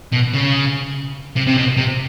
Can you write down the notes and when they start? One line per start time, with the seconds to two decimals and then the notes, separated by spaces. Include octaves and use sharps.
0.13 B2
0.34 C#3
1.37 C3
1.47 C3
1.57 B2
1.77 C3